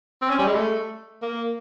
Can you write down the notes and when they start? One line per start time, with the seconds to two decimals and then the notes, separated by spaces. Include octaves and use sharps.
0.22 C4
0.30 C#4
0.39 G3
0.47 G#3
0.55 A3
1.22 A#3